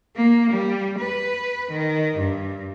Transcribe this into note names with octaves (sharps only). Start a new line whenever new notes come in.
A#3
G3
B4
D#3
G2